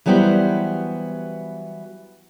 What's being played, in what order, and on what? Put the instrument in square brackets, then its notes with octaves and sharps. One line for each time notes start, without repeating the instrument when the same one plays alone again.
[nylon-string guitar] E3 F#3 G3 B3 G4 C5